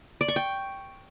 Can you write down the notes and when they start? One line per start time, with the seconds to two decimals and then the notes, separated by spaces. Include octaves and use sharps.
0.21 D5
0.28 C#6
0.36 G5